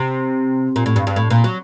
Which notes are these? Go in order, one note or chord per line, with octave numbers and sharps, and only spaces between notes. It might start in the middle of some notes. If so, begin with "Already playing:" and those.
Already playing: C3
A#2
A2
G2
G2
A2
A#2
F#3